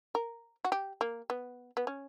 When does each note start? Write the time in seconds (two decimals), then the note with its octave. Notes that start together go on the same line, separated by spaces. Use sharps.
0.15 A#4
0.65 F#4
0.72 G4
1.01 A#3
1.30 B3
1.77 B3
1.87 C#4